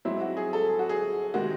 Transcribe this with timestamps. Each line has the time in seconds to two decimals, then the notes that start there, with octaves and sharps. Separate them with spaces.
0.05 G#2 F#3 C4 E4
0.21 F#4
0.37 G#4
0.53 A4
0.69 G#4
0.79 F#4
0.89 G#4
1.34 C3 D#3 G#3 F#4